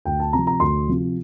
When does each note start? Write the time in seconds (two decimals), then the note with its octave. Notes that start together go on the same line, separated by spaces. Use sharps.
0.05 D2 G5
0.20 A5
0.33 C3 F3 A#5
0.47 A#5
0.60 D2 C6
0.88 C3 F3